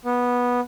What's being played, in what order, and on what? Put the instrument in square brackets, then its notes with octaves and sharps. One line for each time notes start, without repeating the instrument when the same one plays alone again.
[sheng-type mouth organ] B3